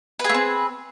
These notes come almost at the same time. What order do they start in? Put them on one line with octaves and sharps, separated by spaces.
B4 G#4 A3 C4